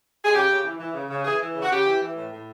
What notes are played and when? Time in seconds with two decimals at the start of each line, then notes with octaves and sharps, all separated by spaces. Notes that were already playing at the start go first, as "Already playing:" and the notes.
0.24 G#4
0.33 C#3 G4
0.48 C#3
0.64 E3
0.79 E3
0.94 C#3
1.09 C#3
1.24 E3 G#4
1.40 E3
1.55 C#3
1.62 F#4
1.70 C#3 G4
1.86 E3
2.01 E3
2.16 A2
2.31 A2